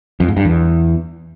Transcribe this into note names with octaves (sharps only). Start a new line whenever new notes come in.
F2
G#2
G2
E2